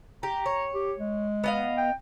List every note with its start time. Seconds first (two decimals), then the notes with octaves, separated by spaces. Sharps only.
0.23 G4 A#5
0.46 C#5
0.74 G4
0.99 G#3
1.44 B3 D#5 F5
1.77 G5